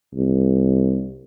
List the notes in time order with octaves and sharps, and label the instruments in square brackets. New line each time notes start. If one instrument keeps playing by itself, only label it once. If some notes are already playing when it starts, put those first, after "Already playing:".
[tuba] C2